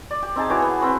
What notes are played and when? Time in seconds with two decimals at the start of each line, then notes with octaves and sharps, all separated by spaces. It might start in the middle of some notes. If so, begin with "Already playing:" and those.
0.11 D5
0.23 G4
0.36 C4 D#4 G#4 A5
0.50 E3 F#4 C#5 D6
0.62 B3
0.81 B3 C4 F#4